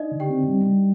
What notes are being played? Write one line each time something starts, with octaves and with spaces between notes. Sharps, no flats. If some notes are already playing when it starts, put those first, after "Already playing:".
Already playing: D4 D#4 D5 D#5
D3
G4 G5
C4
G3
G3